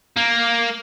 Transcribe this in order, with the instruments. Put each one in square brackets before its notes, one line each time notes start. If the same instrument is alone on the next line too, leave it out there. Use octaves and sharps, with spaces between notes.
[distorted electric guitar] A#3